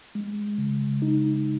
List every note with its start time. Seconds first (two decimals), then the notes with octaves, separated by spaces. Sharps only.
0.15 G#3
0.58 C#3
1.02 D#4